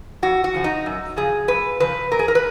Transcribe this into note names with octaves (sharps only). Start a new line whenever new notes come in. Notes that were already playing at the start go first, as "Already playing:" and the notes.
F2 F#4
F#4
C#3 F3
D#4
F#2
C#3 F3 G#4
F#2 B4
C#3 F3 B4
A#2 A#4
G#4
A#4
B4